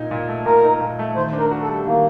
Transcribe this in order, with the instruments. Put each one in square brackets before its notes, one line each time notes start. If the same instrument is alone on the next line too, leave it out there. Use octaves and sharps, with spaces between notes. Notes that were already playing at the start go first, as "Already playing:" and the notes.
Already playing: [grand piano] A#2 D#4
A#2
A3
[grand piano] A#2 [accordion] A#4
[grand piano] D#4
A#2
A3
[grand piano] D#3 [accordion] C5
[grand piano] D4
[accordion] A#4
[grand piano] F#4
[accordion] A4
[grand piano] G3
[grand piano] D#3 [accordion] A#3